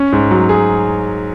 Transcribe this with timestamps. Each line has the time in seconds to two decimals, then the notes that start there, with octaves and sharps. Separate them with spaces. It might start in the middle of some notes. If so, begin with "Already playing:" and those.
Already playing: C#4
0.12 G#2
0.31 F#3
0.49 G#4